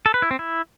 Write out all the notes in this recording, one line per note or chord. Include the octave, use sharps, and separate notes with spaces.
A4
B4
E4
C4
E4